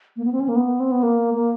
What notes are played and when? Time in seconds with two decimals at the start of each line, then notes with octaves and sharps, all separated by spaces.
0.17 A#3
0.25 B3
0.32 C4
0.40 C#4
0.49 A#3
0.56 B3
0.80 C4
0.92 B3
1.03 A#3
1.34 A#3